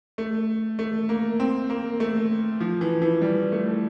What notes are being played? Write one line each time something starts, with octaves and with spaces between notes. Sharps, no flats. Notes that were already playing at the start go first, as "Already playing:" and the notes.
A3
A3
A#3
C4
A#3
A3
F3
E3
E3
G3
A3